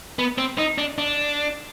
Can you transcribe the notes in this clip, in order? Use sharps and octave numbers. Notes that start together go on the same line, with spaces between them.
B3
C4
D#4
D4
D4